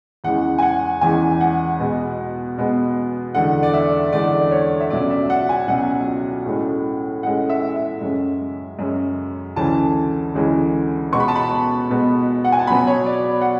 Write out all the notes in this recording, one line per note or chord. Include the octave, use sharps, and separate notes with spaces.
E2 C#3 E3 G#3 F#5
G#5
F#5
E2 C#3 E3 G#3 G#5
F#5
B2 G#3 B3
B2 G#3 B3
E2 D3 G#3 F#5
D5
E5
E2 D3 G#3 D5
C#5
E5
C#2 B2 F#3 C#4 D5
E5
F#5
G#5
C#2 B2 F#3 C#4 F#5
A2 G#3 C#4
A2 G#3 C#4 F#5
E5
E5
F#2 C#3 G#3 C#4
F#2 C#3 G#3 C#4
D2 C#3 E3 G#3 C#4 A5
D2 C#3 E3 G#3 C#4
B2 G#3 B3 C#6
B5
A5
B5
B2 G#3 B3
F#5
G#5
A5
B2 F#3 B3 B5
C#5
D5
F#5